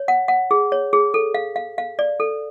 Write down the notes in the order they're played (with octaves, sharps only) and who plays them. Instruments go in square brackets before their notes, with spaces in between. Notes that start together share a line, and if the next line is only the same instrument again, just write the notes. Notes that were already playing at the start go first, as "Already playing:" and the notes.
Already playing: [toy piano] C#5
F#5
F#5
G#4
C#5
G#4
A4
F5
F5
F5
D5
A4